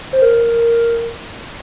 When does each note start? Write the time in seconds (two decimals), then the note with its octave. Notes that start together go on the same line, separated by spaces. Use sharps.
0.13 C5
0.22 A#4